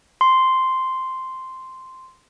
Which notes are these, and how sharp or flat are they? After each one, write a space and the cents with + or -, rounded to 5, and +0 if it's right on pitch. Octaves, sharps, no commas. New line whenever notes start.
C6 -5